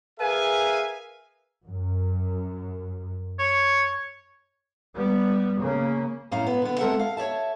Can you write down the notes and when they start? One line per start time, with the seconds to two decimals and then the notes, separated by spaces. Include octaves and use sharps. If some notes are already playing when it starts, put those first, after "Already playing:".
0.19 G#4 A#4 B4 E5 F5 G#5
1.65 F#2
3.39 C#5
4.96 G3 B3
5.61 C#3 A#3
6.31 F#2 A2 C#4 C#5 F5 A#5
6.46 B3
6.62 D3 B3
6.79 G#3 C4 A4 A#4 E5 F#5
6.99 F5
7.17 C#5 D5 E5 A5